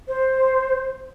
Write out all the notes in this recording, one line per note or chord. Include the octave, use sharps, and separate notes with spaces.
C5